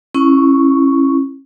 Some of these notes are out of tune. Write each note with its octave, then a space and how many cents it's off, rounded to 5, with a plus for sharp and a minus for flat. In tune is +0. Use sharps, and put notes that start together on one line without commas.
C#4 -30 E4 +0 C#6 +0